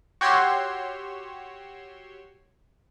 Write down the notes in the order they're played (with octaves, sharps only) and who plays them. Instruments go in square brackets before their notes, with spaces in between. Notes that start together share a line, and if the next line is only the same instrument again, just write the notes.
[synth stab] F#4 G4 C#5 C6 E6